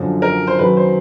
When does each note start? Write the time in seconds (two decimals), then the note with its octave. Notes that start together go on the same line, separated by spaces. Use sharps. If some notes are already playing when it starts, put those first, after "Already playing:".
Already playing: F#2 D3 F3
0.22 A#4
0.47 C5
0.59 F#2 D#3 F#3 B4
0.77 C5